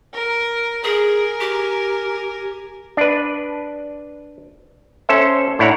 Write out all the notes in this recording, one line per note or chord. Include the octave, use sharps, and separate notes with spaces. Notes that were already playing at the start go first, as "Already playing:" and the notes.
A#4
G#4 A#4 G#5
G4
D4 B4
C#4 A4 C5 E5
A2 D4 E4 C#5 F#5 A#5